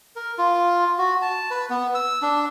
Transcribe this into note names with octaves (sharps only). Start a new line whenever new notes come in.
A#4
F4
F#4
A5
B4
B3
E6
D4